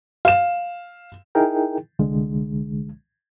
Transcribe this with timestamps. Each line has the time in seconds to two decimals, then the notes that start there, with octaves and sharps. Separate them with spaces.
0.25 F5 E7
1.35 D#4 E4 G#4 A#4 G5
1.99 C2 D3 G#3